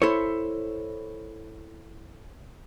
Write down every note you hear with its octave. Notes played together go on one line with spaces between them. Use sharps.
E4 A4 C5 C#5